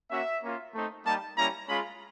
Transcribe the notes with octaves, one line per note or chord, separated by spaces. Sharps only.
A#3 C#4 F#4 E5
A#3 C#4 F4
A3 C4 D#4
G3 A#3 D#4 G4 A5
G3 A#3 C#4 E4 A#5
G#3 C#4 F4 B5